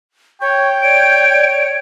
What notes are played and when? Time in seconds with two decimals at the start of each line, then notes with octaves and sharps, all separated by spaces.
0.42 C#5 G5 C#6
0.82 C#5 D5 D7